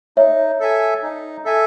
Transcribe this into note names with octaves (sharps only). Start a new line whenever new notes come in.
D#4 C#5 E5
A4 E5 G#5
D#4
A4 E5 G#5